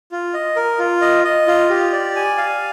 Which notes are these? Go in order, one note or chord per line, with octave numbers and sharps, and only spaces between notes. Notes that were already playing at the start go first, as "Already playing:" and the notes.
F4
D#5
A#4
F4
D#5
D#5
F4
G4
D5
G#5
F5